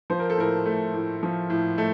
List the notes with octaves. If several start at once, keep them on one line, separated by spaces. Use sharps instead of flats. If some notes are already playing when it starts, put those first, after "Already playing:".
F3 C5
A#4
A4
A2 A#4
A3
A2
F3
A2
A3